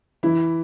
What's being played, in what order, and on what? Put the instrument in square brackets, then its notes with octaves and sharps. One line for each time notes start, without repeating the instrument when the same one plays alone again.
[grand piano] E3 E4